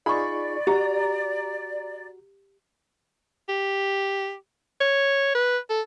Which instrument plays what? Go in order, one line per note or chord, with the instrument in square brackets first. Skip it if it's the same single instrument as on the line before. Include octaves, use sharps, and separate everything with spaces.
[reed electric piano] D#4 F4 G#4 [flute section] D5 [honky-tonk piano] B5 C#6
[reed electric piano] F#4 [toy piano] G4 [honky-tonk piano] A#5
[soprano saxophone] G4
C#5
B4
A4